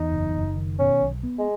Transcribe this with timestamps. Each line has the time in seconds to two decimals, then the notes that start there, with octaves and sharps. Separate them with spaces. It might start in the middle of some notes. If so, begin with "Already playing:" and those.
Already playing: E2 D#4
0.12 F#1
0.34 F#1
0.57 D#3
0.79 B2 C#4
1.02 B1
1.23 B3
1.39 G#3